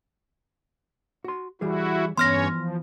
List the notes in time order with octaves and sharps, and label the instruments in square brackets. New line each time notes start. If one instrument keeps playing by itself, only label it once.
[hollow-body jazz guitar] F#4 C6
[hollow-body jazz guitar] E3 G3 G#4 [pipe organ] E4 F#4
[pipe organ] G2 C#4 C#5 [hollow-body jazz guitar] E3 B3 [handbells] C6 F6 A#6
[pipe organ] F3